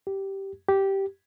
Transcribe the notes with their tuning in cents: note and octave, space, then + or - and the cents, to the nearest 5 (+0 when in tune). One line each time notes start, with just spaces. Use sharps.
G4 -10
G4 -10